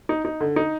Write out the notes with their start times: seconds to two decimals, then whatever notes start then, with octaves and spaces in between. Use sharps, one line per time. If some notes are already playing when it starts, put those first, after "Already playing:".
0.09 D#4
0.25 D#4
0.40 D3
0.56 D#4